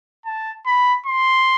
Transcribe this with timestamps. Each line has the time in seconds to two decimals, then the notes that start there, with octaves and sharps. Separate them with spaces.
0.26 A5
0.66 B5
1.06 C6